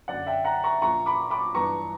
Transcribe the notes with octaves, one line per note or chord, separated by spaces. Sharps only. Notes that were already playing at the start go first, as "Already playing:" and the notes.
F#1 F#2 D3 D5 F#5
E5 G5
F#5 A#5
A#5 C#6
A#1 A#2 A#3 A#5 C#6
B5 D6
B5 D6
G2 E3 B3 D4 A#5 C#6